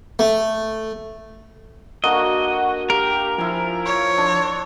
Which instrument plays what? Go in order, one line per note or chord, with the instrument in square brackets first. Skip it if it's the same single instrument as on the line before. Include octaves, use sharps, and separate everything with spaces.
[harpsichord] A3
[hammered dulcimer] D3 A#3 [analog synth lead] F#4 [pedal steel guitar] D#5
[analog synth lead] G4 [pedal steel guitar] A#4 [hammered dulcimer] F5
[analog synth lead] F3 [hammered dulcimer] E4 G#5
[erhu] C#5
[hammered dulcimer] D4 C6